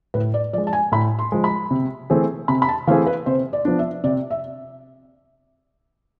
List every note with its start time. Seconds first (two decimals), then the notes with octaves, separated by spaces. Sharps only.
0.14 A2 B4
0.34 D5
0.53 F3 D5
0.58 G#3
0.67 A5
0.73 G#5
0.92 A2 B5
1.19 C6
1.32 F3 G#3
1.44 B5
1.71 C3
2.10 E3 A3 C4 G#4
2.48 C3 B5
2.62 B5
2.68 A5
2.87 E3 A3 C4 G#4 F5
3.07 B4
3.26 C3 C5
3.53 D5
3.65 F3 B3 D4
3.79 E5
4.04 C3 D5
4.31 E5